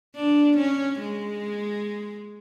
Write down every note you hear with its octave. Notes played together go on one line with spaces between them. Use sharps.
D4
C#4
G#3